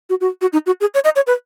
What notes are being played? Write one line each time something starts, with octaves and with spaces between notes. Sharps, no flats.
F#4
F#4
F#4
D#4
F#4
G#4
C#5
D#5
C#5
B4